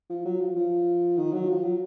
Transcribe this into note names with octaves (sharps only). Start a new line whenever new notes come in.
F3
F#3
F3
F3
D#3
F#3
F3
F#3